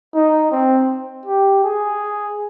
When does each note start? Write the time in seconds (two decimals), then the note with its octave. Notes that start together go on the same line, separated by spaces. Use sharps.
0.14 D#4
0.52 C4
1.26 G4
1.64 G#4